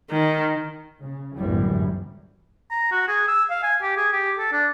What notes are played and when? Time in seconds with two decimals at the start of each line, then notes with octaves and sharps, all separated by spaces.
0.10 D#3
1.01 C#3
1.37 G1 C#2 F#2 A2 E3 G3
2.71 A#5
2.92 F#4
3.08 G#4
3.28 E6
3.50 F5
3.63 G#5
3.82 G4
3.97 G#4
4.13 G4
4.38 A4
4.52 D4